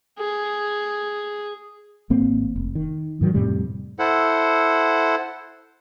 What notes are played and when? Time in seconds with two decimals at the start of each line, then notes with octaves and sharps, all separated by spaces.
0.19 G#4
2.10 G#1 A#3 C4
2.56 F1
2.75 D#3
3.21 G#2 D#3 F#3
3.34 F2 A2 C3 G3
3.99 E4 A4 C5 F#5